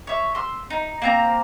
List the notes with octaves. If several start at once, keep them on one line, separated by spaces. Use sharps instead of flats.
C#5 E5
C6 E6
D#4
A#3 C4 A#5